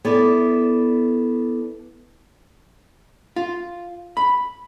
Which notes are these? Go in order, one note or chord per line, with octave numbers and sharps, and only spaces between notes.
B3 E4 A4 D5
F4
B5